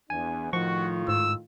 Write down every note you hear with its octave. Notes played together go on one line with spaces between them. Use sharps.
E2 D4 G#5
A2 D#3 F3 F4 F#4 C#6
G#2 E6